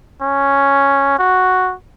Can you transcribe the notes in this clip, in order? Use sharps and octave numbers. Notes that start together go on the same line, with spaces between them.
C#4
F#4